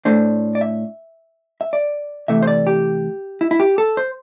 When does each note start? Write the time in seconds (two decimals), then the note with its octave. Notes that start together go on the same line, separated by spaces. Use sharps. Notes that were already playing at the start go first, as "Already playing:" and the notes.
0.05 A2 A3 D4 C5
0.55 D5
0.61 E5
1.61 E5
1.73 D5
2.28 C3 E3 A3 E5
2.43 C5
2.47 D5
2.67 G4
3.41 E4
3.51 E4
3.60 G4
3.78 A4
3.97 C5